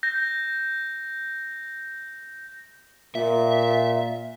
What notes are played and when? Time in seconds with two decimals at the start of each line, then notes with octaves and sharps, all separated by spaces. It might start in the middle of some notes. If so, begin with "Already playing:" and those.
0.03 G6 A#6
3.15 A#2 E5